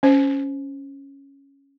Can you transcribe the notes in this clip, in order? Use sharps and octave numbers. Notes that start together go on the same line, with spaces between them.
C#4 C5